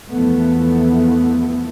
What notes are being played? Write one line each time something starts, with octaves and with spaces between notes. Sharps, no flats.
E2 E3 F3 A3 B3